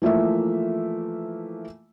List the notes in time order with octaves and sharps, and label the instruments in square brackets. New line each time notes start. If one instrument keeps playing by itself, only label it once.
[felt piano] E3 F3 A3 A#3 E5